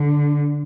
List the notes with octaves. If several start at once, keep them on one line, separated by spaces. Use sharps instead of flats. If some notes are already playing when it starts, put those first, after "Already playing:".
Already playing: D3